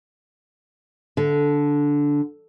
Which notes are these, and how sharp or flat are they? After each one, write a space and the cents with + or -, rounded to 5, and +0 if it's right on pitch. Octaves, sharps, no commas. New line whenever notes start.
D3 -10